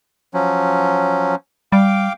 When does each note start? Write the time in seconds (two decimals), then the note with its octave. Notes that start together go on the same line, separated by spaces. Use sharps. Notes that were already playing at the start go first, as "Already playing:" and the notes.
0.34 F3 F#3 C#4
1.72 G3 F5 G5 D6